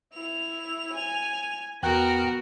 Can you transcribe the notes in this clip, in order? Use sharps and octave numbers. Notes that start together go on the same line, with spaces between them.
E4 F7
G#5
E2 B3 F#4 A#4 G5 F6 F#6